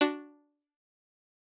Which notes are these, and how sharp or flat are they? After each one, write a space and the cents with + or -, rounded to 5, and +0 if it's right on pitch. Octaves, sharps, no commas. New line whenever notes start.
D4 -5 F#4 +0